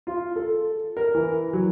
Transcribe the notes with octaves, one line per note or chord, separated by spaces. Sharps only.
F4
A4
A#4
E3
F#3